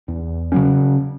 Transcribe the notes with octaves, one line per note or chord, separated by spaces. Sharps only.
E2
C#3 F#3 C#4